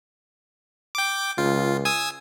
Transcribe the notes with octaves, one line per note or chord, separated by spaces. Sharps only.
G5 D6
C#2 F4
G#5 D#6 E6